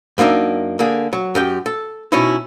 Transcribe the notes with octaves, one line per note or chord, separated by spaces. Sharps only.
F#2 A#3 D4 D#4 E5
D3 A#3 G#4
F#3
F#2 G4 G5
A4
B2 C#4 D#4 E4